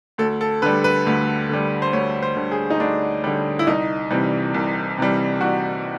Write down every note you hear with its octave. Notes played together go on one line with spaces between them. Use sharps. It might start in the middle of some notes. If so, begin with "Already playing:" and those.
D2 A4
A4
D3 G3 B4
B4
D2
D3 G3
C5
D2 C#5
C5
D3 G3
G#4
D#4
D2 D4
D3 G3
E4
C2 D#4
C3 E3 G3
C2
C3 E3 G3
C2 F#4